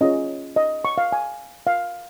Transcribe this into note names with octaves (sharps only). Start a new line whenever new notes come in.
C#4 F4 G#4 C#5 D#5
D#5
C#6
F5
G#5
F5